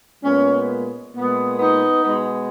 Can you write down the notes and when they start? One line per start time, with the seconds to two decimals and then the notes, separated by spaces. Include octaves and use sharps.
0.23 A#2 G#3 B3 C#4
1.14 A#2 G#3 B3
1.59 B3 D#4
2.04 B2 G#3 B3